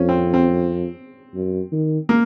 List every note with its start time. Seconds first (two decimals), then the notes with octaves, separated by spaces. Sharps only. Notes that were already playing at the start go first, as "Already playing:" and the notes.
Already playing: F2 C#4
0.09 C4
0.34 C4
1.34 F#2
1.72 D#3
2.09 A#3